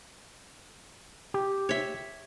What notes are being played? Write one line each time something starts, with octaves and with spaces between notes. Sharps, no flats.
G4
C#5 E5